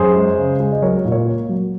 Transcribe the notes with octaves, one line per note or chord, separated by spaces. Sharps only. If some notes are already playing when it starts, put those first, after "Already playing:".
Already playing: F#2 G#4 C5
G#3
C#3
G#3
D#5
F#3 A#4 C#5
A#2
A#4 C#5
A#3
F#3